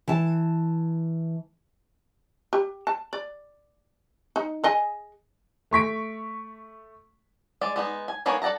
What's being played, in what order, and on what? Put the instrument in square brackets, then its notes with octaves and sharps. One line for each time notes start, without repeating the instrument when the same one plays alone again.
[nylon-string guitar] E3 A5
[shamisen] G4
A5
D5
D#4
G#4 D#5 G#5
[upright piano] A3 C#6 B6 D7
[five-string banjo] G#3 D5
G#3 B3 D#4
G#5
A#3 B3 G#4 A#4 C#5
A4 D5 F#5 A5 A#5